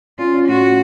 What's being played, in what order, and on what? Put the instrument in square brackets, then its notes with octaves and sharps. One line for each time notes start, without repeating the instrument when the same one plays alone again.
[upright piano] C#4 [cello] F4
[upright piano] C#4
[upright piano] A2 [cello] F#4
[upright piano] A3